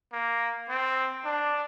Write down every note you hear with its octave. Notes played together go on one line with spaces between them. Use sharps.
A#3
C4
D4